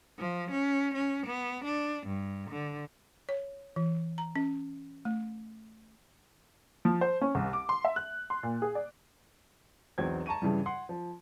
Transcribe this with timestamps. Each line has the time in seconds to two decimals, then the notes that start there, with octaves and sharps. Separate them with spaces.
0.19 F3
0.51 C#4
0.94 C#4
1.26 B3
1.65 D4
2.07 G2
2.50 D3
3.29 C#5
3.76 E3
4.18 A#5
4.36 C#4
5.05 A3
6.85 F3
7.01 C5
7.21 C#4
7.35 C2
7.53 D6
7.69 C6
7.85 E5
7.96 F#6
8.30 C6
8.43 A#2
8.62 G#4
8.75 D5
9.98 B1 E2 F#3 C4 G5 G#6
10.26 A5 A#5 C#6 D#7
10.42 G2 C#3 E3 G3
10.66 F#5 C6
10.89 F3